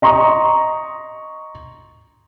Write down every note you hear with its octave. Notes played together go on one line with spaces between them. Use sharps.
D#5 A#5 C6 C#6 D#6